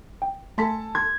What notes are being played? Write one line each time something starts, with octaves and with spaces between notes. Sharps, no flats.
G5
A3 A4 G#5 A5 C6 B6
C6 G#6